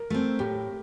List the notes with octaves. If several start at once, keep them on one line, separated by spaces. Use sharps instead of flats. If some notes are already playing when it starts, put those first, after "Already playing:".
Already playing: A#4
A3 C4
A2 G4